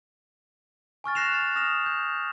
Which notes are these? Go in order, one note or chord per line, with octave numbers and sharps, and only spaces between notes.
G#5 C#6 F6 A6
F#6 A#6 C7 E7 F7
F6 A6
D#6 F6 A#6 E7 F7
G6